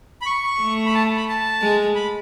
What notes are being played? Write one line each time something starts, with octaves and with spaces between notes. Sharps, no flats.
B5
C#6
A3
B5
A5
B5
A5
G#3
B5